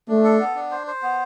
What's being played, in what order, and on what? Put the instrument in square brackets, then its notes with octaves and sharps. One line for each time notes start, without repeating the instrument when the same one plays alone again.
[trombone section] A3 [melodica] D4
[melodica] A4
B3
D4
C5
C5
B3